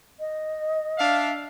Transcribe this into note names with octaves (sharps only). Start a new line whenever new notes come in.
D#5
D4 E5 F5